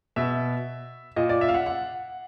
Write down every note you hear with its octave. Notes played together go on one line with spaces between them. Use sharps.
B2 E5
A#2 D#5
D5
E5
F5
F#5
F#5